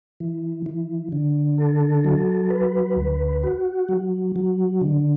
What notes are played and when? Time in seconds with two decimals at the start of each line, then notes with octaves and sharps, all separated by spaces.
0.20 E3
0.66 E3
1.12 D3
1.58 A4
2.04 F#3
2.50 B4
2.96 D2
3.43 F#4
3.89 F#3
4.36 F#3
4.81 D3